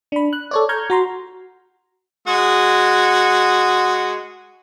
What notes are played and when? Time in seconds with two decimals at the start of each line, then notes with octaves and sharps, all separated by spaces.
0.12 D4 B5
0.33 F#6
0.51 A4 C#5 D5
0.69 A#5 C#6 F6 G6 G#6
0.90 F#4 A#5 C6
2.27 G#3 F#4